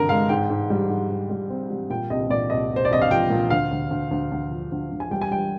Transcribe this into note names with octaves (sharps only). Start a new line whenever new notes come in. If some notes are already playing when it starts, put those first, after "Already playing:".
Already playing: G2 D3 C4 A#4
G#3 F5
G#2 G5
G#2
G3
G#2
G#2
G3
C4
G3
A#2 G5
C2 D#5
A#2 D5
C2 D#5
C2
C5
D5
C2 D#5
F5
F3 G5
A#2
D2 F5
D2
D2
D2
D2
F3
D2
D2
G#5
G3 G5
G#5
G3 G5